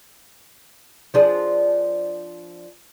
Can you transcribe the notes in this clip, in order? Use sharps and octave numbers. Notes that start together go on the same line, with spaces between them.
F3 D4 G#4